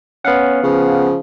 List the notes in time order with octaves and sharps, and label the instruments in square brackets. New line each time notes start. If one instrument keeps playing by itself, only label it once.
[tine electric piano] B3 F5 F#5 [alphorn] C#4
[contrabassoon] C#3 [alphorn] F3